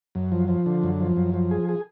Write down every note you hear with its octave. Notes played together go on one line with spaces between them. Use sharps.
F#2
F3
F3
D3
F#2
F3
F#2
F3
G#4
G#4